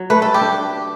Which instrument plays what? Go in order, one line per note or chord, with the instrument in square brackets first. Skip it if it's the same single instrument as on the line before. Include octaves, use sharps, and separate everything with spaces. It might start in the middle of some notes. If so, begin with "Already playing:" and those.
Already playing: [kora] F#3
[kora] A3 [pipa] B4
[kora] G3 [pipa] A4
[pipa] G4
[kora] D4